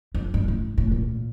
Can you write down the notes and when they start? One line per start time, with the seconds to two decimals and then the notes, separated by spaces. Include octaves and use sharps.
0.15 F2
0.34 G2
0.48 A2
0.78 A2
0.92 A#2